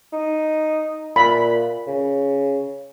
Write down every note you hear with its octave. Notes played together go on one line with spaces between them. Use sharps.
D#4
A#2 B5
C#3